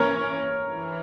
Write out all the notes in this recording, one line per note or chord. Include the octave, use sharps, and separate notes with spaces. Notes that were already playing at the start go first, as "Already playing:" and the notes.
Already playing: E3 A#3 C#4 A#4 C#5
E3